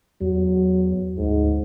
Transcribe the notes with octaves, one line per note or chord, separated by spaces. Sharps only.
E2 F#3
D2 G#2